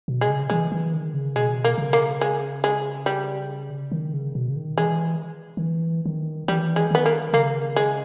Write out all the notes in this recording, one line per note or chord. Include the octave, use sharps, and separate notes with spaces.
B2
G#3
C#3
E3 G#3
E3
D#3
C#3
B2 G#3
A#3
C#3
A#3
G#3
G#3
G3
D#3
C#3
B2
C#3
D#3
E3 G#3
D#3
E3
D#3
E3 G3
G#3
D#3 B3
A#3
C#3 A#3
G#3